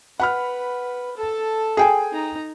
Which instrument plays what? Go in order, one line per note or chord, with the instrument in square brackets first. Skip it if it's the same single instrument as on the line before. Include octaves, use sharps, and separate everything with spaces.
[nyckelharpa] B4 [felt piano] F#5 B5 F6
[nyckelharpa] A4 A5
[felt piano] G#4 G5 G#5
[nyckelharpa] D#4 A#5